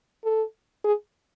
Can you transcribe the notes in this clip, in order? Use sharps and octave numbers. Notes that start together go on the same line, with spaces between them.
A4
G#4